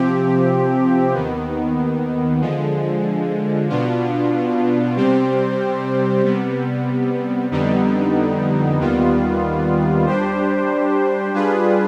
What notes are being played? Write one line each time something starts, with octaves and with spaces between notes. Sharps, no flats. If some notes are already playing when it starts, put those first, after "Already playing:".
Already playing: C3 F3 C4 G4
D#2 D#3 B3
D3 F3 G#3
B2 B3 D4 F4
C3 G3 C4 G4 C5
C3 G3 B3
F2 D3 G3 B3 D#4
D#2 D#3 G3 B3 F4
G3 D4 G4 C5
G3 D4 F4 G#4 B4